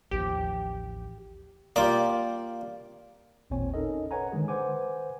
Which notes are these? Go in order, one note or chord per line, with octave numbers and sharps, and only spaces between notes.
A1 D#2 F3 G4
A#3 F4 G4 D5
G#1 D#2 A#2 C4 C#5 G#5
C#4 D#4 A4 A#4 D#5
B4 C#5 F#5 G#5 A#5
D3 D#3 G#3 G#4
B4 C5 F#5 G#5 D6